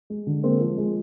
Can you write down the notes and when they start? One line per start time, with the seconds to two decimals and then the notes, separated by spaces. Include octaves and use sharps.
0.10 G#3
0.27 D3
0.44 G#3 A#3 C4
0.61 F3
0.78 G#3